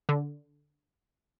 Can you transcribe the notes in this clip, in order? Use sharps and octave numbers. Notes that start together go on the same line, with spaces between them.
D3